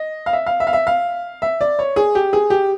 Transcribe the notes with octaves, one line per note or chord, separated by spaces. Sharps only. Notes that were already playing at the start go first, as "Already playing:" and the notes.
Already playing: D#5
F5
E5
F5
E5
F5
E5
F5
E5
D5
C#5
G#4
G4
G#4
G4